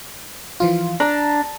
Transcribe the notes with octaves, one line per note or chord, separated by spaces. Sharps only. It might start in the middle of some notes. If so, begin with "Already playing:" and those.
E3 F3 F4
D4 A#5